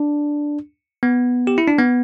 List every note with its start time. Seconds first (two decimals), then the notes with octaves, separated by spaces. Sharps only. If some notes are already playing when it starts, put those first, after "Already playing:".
Already playing: D4
1.03 B3
1.47 G4
1.58 E4
1.68 D4
1.79 B3